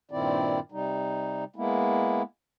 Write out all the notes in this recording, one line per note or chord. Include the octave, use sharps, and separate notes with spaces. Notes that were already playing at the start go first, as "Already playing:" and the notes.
G2 A#2 D#3 C4 E4 D5
C3 G3 D#4
G#3 A#3 B3 E4